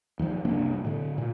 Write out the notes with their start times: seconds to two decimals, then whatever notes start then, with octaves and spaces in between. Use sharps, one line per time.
0.19 D#2 F3
0.45 F#1 C2 A#3 D4
0.85 A2 D3
1.18 A#2